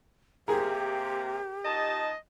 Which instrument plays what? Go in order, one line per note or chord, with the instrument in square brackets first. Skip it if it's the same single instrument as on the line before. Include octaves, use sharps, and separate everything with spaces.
[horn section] C3 A#3 [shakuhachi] G4 [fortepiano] G#4 A#4
[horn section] A#2 D#4 A5 [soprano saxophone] D#5